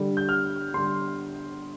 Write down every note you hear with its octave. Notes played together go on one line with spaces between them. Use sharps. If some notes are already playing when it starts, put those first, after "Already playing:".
Already playing: D3 G3
G6
F6
D3 G3 C6